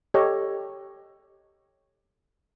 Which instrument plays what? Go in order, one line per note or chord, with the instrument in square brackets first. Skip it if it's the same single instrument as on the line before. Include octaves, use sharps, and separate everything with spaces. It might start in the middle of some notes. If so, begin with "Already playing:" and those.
[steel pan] G4 A4 C#5 D#5